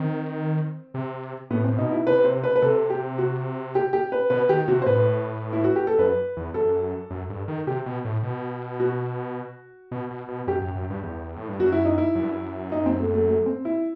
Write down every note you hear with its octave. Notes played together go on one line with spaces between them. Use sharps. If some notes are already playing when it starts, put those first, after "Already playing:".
Already playing: D#3 C4
C3
A2 B3
A2 C4
B2 D#4
E4
C3 B4
C5
B4
B4
C3 A4
G4
F#4
G4
G4
B4
B2 B4
D#3 G4
C3 F#4
C5
A2 B4
E4
F#4
G4
A4
F#2 B4
E2
F#2 A4
F#2
G2
D#3
C3 G4
B2
A2
B2
F#4
B2
B2
B2
F#2 G4
F#2
F#2
G2
E2
A2
G2
F#2 F#4
E4
D#4
E4
F#2
G2
F#2
D#4
C4
A3
A3
A3
C4
E4